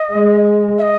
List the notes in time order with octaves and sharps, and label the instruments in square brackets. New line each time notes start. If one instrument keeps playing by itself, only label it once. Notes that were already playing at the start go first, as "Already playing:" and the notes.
Already playing: [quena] D#5
[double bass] G#3
[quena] E5
D#5